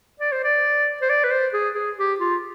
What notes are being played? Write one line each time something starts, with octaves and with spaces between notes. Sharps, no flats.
D5
C5
D5
C5
D5
B4
C5
G#4
G#4
G4
F4